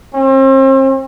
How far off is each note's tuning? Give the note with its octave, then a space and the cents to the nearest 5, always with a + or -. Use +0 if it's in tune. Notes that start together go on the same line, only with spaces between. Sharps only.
C4 +40